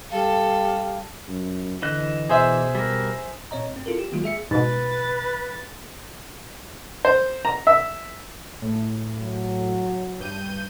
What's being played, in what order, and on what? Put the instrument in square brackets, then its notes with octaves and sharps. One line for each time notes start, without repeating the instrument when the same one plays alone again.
[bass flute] G3 [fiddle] A4 [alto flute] F5
[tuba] F#2
[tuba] D3 [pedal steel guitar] E3 D#5 F#6
[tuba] B2 [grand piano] G#4 C5 E5
[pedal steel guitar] G3 A#4
[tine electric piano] A#2 C4 C#5 D#5 A#5
G2 C4
E4 F4 A4 A#4
G4
D#3 F#3 G#3 A#3 F4 F#4
G#4 E5 C#7
[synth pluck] G#2 B2 [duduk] B4 [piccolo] A6
[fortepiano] C5
A#5
E5
[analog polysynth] A2
[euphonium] F#3
[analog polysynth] G2 G6 D#7